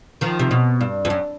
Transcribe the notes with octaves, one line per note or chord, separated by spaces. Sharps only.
D#3 F3
C3
B2
G2
F2
F#2